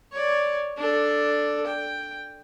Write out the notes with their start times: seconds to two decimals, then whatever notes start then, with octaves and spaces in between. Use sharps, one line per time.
0.12 C#5 D5
0.77 D4 A4
1.67 G5